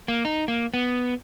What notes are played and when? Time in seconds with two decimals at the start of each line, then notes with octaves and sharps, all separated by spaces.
0.08 A#3
0.25 D#4
0.48 A#3
0.74 B3